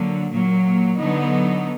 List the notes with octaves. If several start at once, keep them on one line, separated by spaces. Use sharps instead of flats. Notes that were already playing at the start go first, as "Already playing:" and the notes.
Already playing: D3 F#3 A#3
A#2 F#3 A#3
D3 F#3 B3 D#4